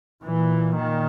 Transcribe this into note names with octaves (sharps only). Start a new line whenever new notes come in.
A#2 E3
D#3